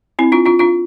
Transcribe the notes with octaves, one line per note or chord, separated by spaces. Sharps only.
C4 E4
D4 F4
D4 F4
D4 F4